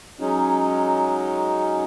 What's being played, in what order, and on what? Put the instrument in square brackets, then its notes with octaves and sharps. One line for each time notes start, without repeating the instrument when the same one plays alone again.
[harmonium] F#3 G#3 C#4 D#4